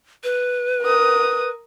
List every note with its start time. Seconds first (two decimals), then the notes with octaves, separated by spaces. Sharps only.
0.24 B4
0.82 A#4 D#6